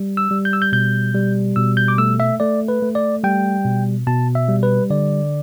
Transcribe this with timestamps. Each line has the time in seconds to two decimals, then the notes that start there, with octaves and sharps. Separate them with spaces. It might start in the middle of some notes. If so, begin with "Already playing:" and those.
Already playing: G3
0.17 E6
0.31 G3
0.45 G6
0.53 E6
0.62 G6
0.72 B2 G6
1.14 G3
1.56 B2 E6
1.77 G6
1.88 D6
1.98 A3 E6
2.20 E5
2.40 A3 D5
2.68 B4
2.82 A3
2.95 D5
3.24 G3 G5
3.65 B2
4.07 B2 A5
4.35 E5
4.49 G3
4.63 B4
4.90 D3 D5